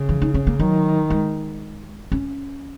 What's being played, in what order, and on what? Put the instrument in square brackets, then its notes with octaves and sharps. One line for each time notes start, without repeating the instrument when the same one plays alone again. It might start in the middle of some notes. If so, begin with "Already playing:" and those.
Already playing: [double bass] C#3
[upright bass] E3
D#4
C#4
A#3
[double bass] D#3 [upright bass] F#3
[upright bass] G#3
C#4